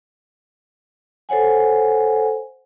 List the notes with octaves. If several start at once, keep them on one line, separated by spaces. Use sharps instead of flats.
A4 C5 C#5 F#5 G#5